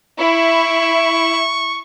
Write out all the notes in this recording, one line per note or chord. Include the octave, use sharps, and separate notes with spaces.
E4 C#6